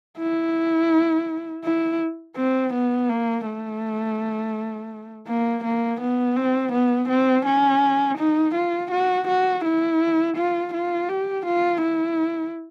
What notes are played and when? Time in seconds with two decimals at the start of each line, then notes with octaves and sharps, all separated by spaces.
0.19 E4
1.64 E4
2.37 C4
2.74 B3
3.09 A#3
3.46 A3
5.27 A#3
5.64 A#3
6.01 B3
6.37 C4
6.73 B3
7.09 C4
7.46 C#4
8.18 D#4
8.55 F4
8.91 F#4
9.28 F#4
9.65 E4
10.37 F4
10.74 F4
11.09 G4
11.46 F4
11.82 E4